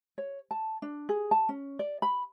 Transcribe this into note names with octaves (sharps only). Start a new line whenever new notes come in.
C#5
A5
D4
G#4
A5
C#4
D5
B5